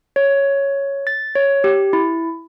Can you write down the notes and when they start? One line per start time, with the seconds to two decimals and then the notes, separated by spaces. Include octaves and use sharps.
0.16 C#5
1.07 A6
1.35 C#5
1.64 G4
1.93 E4